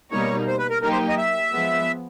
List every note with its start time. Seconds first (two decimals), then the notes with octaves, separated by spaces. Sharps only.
0.11 B2 G3 A#3 D#4 C#5
0.48 C5
0.59 B4
0.70 A#4
0.82 F#3 A#3 D#4 G4 A#4
0.92 C5
1.09 D#5
1.18 E5
1.53 F3 G#3 B3